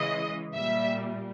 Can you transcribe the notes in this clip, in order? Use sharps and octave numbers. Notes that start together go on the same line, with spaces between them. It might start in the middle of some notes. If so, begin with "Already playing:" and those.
Already playing: C#3 E3 G#3 D#5
A#2 G3 E5